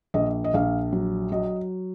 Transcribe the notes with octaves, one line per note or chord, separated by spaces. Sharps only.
A#1 D#5
D#5
A#1 F5
F#3
F#3 D#5